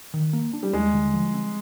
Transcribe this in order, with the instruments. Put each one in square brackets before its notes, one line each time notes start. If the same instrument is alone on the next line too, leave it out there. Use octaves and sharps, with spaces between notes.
[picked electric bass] D#3
A#3
D4
[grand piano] G3
[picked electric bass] D#2 [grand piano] G#3
[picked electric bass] D3
F3
C4